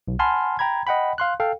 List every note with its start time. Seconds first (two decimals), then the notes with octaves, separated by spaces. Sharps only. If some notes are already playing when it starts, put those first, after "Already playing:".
0.08 B1
0.19 F#5 G#5 A5 B5 C6 F6
0.59 G5 A#5 B5 G#6
0.87 D#5 F#5 G5 B5
1.18 F5 C6 F#6
1.40 A4 F5 G5